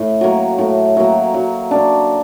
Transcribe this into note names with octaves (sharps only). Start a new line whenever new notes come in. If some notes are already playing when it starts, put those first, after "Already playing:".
Already playing: A2
F#3 A#3
A2
F#3 A#3
F#3
A#3 D4